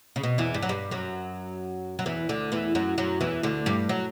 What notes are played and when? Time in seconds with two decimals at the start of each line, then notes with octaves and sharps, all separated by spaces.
0.16 C#3
0.23 B2
0.38 E2 E3
0.54 G2 G3
0.62 F#3
0.69 G2 G3
0.91 F#2 F#3
1.99 F#3
2.06 E2 E3
2.29 D2 D3
2.52 E2 E3
2.75 F#2 F#3
2.98 F#2 F#3
3.21 E2 E3
3.43 D2 D3
3.66 G2 G3
3.89 F#3